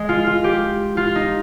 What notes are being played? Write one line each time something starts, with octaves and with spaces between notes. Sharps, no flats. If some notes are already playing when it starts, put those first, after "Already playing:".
Already playing: G#3
F4
F4
G4
F4
D#4